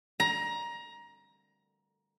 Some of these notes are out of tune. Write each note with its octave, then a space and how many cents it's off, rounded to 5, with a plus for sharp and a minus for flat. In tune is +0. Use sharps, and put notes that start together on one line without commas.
A#5 +20